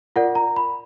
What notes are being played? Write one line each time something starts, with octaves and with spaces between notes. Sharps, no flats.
F4 A#4 D5 F#5
A#5
B5